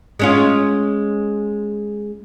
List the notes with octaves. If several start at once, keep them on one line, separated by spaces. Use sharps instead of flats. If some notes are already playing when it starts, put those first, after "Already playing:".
G#3 C#4 F4